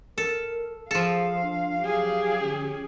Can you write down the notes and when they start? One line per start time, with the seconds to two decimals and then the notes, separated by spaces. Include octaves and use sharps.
0.18 A4 A#4
0.91 F3 G#4 A4 F5
1.42 D4
1.81 F#3 G4 G#4
2.42 D3 C#4